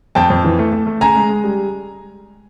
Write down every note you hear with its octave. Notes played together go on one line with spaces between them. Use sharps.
F2 G5 A5
F2
E3
A3
A3
A3
C#3 G#5 A#5
G#3
G#3
G3